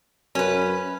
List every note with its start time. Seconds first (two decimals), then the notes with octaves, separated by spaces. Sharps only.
0.35 F#2 C#4 B4